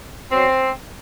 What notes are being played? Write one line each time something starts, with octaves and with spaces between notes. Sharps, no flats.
B2 F#3 C4